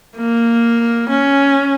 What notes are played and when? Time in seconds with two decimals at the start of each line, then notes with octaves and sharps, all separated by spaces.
0.17 A#3
1.09 C#4